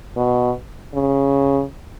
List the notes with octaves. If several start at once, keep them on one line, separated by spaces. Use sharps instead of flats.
B2
C#3